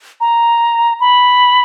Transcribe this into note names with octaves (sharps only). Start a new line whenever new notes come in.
A#5
B5